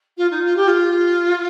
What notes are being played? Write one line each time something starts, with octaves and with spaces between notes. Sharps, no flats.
F4
D#4
F4
G4
F4